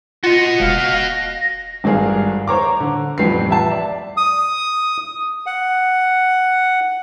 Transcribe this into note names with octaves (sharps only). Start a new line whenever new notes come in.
F4 F#4 D#5 C#7
E1 F5
A#6
G#1 G2 D4 G#4 A#4 F5
C5 C#5 A#5 D6
D3
A1 F2 G3 G4 B4 C7
E5 A5
D5
D#6
F#5